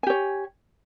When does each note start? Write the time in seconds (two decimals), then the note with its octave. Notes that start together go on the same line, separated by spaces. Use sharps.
0.03 G#5
0.07 G4
0.10 C#5